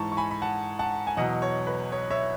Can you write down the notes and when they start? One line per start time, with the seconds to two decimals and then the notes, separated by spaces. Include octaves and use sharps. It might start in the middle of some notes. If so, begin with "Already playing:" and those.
Already playing: G#2 E3 A5 C#6
0.12 C#6
0.17 G#5 B5
0.31 B5
0.42 F#5 A5
0.79 F#5 A5
1.07 G#5
1.17 E2 B2 F#3 D#5 F#5
1.42 C#5
1.67 B4
1.92 C#5
2.10 C#5 E5